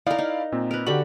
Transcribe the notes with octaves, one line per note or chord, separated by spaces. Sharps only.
D#4 E4 A#4 D5 F5
D#4
A#2 C4
A#4 B4
D3 F#4 G4 B5